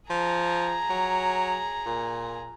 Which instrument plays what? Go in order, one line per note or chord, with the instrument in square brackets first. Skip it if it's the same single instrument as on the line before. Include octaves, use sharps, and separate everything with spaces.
[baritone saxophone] F3 [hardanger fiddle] G#4 A#5
[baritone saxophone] F#3
A#2